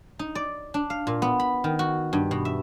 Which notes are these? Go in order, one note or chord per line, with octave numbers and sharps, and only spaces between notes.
D#4
D5
D4
F5
A#2
B3
B5
D#3
F#4
G2
B2
E5